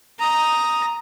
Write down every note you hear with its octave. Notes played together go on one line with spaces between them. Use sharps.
A#5 D#6